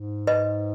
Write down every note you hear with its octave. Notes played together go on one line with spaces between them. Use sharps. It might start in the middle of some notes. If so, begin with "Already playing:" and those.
Already playing: G#2
B4 D#5